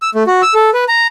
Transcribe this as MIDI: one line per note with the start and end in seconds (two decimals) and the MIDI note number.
0.02 0.10 88
0.15 0.23 57
0.27 0.42 66
0.42 0.54 88
0.54 0.70 69
0.74 0.84 71
0.88 1.07 82